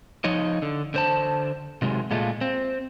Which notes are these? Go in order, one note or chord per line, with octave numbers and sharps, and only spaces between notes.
F3 D#4 C#5 D#5
D3
D3 C5 A5
C3 D#3 F#3 G#3
A#2 G#3 A3 F4
C4